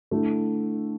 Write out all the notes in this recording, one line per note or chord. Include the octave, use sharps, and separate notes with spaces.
D3 A3 E4